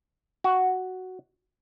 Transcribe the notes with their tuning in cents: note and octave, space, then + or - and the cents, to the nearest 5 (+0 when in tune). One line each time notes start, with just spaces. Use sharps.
F#4 +5